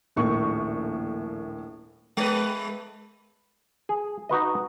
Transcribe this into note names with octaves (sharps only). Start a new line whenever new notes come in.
D#1 A#1 A2 A#3 C#6
G#3 B4
G#4
D#4 F#4 B4 D#5